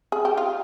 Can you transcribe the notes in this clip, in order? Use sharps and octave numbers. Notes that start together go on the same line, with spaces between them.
G#4
G4
F4